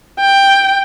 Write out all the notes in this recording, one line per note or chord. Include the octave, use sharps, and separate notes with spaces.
G5